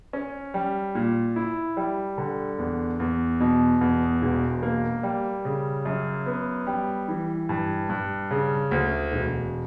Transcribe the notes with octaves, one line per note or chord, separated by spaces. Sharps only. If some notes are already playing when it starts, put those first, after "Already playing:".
C#4
G3
A#2
E4
G3
D3
E2
E2
B2
E2
E1
A#3
G3
C#3
F#2
B3
G3
E3
G2
G2
C#3
D2
E1